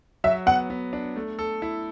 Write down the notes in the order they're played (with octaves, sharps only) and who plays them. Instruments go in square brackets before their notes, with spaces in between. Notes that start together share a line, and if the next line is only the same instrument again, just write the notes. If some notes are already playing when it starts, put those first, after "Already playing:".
[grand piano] F#3 [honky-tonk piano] E5
[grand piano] B3 [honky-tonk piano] F#5
[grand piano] B3
D4
A3
A4
E4